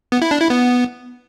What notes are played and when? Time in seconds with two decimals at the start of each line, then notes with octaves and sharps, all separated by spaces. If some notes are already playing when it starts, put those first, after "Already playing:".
0.12 B3
0.22 E4
0.31 D4
0.41 E4
0.50 B3